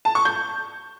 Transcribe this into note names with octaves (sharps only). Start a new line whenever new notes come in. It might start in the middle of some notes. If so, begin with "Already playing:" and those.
A5
C#6
G6